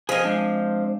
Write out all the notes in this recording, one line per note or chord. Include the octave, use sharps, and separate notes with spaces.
F3 C4 G#4 D#5 G#5
G#3 D4